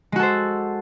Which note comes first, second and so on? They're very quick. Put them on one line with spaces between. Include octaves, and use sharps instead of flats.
G#3 F#4 A4 C5